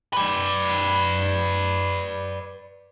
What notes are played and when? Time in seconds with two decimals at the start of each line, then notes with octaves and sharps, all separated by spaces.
0.13 B4 D5